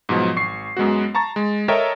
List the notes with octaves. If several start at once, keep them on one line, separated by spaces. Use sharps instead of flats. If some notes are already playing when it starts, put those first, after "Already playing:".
G#2 B2 F3 F#3
G#1 C#6 C7
F#2 G#3 B3 F#4
A5 A#5 C#6 A6
G#3
A4 A#4 C#5 D#5 E5 G5